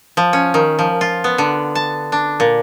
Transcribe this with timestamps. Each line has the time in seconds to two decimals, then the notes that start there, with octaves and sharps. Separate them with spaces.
0.17 F3
0.33 C#4
0.54 D#3
0.79 F3
1.01 F4
1.24 B3
1.38 D3
1.75 A5
2.12 D4
2.40 A#2